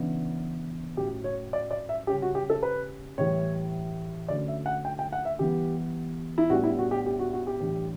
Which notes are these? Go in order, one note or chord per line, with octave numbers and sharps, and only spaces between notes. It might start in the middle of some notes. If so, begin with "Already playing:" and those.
Already playing: C#3 E3 B3 D4
A2 F#3 C#4 G4
C#5
D5
D5
E5
C#3 G3 C#4 G4
F#4
G4
A4
B4
A2 E3 G3 C#5
D3 F#3 A3 C#4 D5
E5
F#5
G5
G5
F#5
E5
E3 G3 B3 G4
E4
A2 G3 B3 D4 F#4
E4
F#4
G4
G4
F#4
F#4
G4
A2 E3 G3 D4